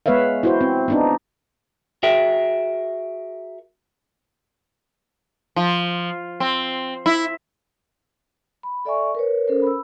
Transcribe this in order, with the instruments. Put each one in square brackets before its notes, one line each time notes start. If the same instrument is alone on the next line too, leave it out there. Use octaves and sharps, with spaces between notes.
[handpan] G#3 B3 B4 C#5 E5 F5
E4 F#4 C5
C4
B3 D4 D#4
[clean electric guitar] F#4 G#4 A#4 E5 G5
[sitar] F3
C4
E4
[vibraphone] B5
A4 D5 E5 G#5 C#6
A#4 B4 C#5
C#4 A4 A#4 C5
B5 E6